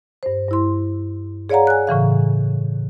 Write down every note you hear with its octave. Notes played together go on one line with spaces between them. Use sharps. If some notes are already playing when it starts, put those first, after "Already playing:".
G2 C5
G2 E4 C6
G#4 C#5 D5 F5 F#5 A#5
G#5 F#6
A2 C#3 E3 F5